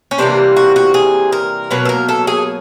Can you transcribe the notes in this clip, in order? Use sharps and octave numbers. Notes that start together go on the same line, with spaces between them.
C#4
C3 E3 G3 A#3 D4
F#4
F#4
G#4
A#4
B2 F#3 A#3 B4
A4
A#4
A4
G#4